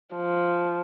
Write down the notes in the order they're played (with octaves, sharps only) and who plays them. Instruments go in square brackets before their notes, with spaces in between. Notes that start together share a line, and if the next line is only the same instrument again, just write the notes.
[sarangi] F3